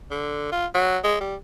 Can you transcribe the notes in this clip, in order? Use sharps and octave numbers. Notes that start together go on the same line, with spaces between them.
D3
F4
F#3
G#3
G3